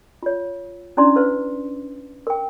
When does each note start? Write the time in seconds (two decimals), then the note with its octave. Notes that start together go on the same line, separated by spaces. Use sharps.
0.23 F4 C#5
0.97 C#4 D4 E4 D5 A#5 C6
1.16 B4 C5 F5
2.27 A#4 G5